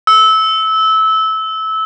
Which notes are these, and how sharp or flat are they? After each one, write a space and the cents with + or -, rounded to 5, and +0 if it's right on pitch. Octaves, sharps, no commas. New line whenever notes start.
E6 -20